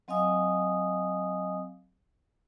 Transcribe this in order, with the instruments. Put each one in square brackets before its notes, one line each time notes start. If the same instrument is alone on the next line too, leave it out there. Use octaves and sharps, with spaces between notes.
[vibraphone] F#3 C4 D#5 F5 G#5 D#6